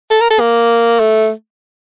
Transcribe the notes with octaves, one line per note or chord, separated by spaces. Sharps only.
A4
A#4
A4
A#3
A3